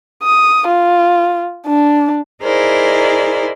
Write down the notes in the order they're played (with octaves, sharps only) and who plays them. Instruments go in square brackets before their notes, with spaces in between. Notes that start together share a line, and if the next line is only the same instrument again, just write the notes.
[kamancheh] D#6
F4
D4
[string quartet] D#4 E4 G#4 A#4 C5 D5